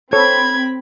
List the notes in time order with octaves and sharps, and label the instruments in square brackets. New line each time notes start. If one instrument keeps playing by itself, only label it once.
[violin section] C4 B5 [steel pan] A4 C#5 [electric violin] G#6